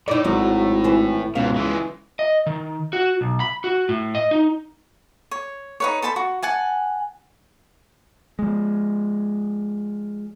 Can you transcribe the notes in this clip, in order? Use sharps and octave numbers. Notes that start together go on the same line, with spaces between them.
A2 D#4 D5
G#1 F#3
E3 C5
C#2 G#2 B2 F5
E3 G#3
D#5
D#3
F#4
B1
B5
F#4
A2
D#5
D#4
C#5
D#4 B4 C#5
A4 C5 A5 B5
F#4
F#5 G#5 A5
F3 G#3